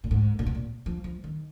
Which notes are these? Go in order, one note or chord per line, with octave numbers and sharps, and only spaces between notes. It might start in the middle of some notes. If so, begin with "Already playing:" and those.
A#2
G#2
A#2
B2
A#2
F3
F3
D#3